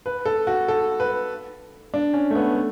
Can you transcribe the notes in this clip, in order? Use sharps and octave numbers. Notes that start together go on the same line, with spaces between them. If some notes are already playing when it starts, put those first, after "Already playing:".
B4
A4
F#4
A4
B4
D4
C#4
A3
B3
A3